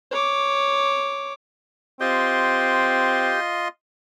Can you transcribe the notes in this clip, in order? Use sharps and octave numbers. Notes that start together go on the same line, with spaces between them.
C#5 D6
C4 F4 G4 D#5 C6